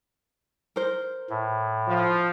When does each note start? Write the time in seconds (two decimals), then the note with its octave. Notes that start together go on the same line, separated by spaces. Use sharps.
0.76 A#4 C5
1.30 A2
1.88 F3